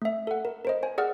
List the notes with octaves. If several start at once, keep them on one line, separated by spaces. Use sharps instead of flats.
A3 E5
A4 F#5
A#4
A#4 C5 D#5
C5 G#5
G#4 D5 F#5 F6